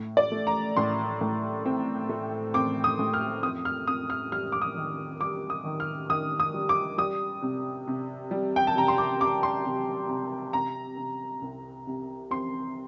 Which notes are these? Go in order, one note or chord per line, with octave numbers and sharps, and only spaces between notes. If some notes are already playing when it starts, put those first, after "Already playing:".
Already playing: A2
D5
A3
A#5
A2 C6
A2
C4
A3
C4 D6
D#6
A2
F6
F2 D#6
F6
F2 D#6
F6
G3 F6
D6
D#6
D#3
G3 D6
D#6
D#3
F6
D#3 D#6
D#6
G3
D6
G3 D#6
C3
C3
G3
G5
A5
C3 A#5
C6
D6
C3 D6
C6
C3
C3
C3 A#5
C3
C2
C3
C4 C6